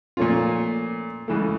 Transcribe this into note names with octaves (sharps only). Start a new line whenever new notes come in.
A#2 F3 A3 C#4 F4
C#2 C#3 E3 A3